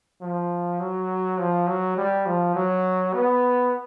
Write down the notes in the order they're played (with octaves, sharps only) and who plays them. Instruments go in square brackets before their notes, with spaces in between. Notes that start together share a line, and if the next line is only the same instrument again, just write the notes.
[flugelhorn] F3
F#3
F3
F#3
G3
F3
F#3
B3